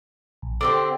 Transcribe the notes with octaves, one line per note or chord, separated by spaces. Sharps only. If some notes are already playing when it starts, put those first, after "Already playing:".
A#1
D3 C4 G4 D6